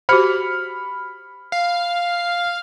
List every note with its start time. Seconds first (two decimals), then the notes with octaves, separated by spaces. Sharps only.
0.09 F#4 G4 C5 B5 F6 C#7
1.52 F5